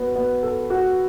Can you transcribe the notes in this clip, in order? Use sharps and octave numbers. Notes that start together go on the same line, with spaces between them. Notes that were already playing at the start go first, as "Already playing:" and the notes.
Already playing: B3 F#4
B3
A4
F#4